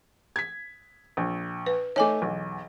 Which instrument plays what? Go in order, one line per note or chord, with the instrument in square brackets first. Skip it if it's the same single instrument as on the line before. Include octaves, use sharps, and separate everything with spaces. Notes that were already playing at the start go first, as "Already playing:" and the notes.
[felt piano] G#6 B6
A#1
[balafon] B4
[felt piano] A3 D#4 [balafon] C#5 G#5 D6
[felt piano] B1 E2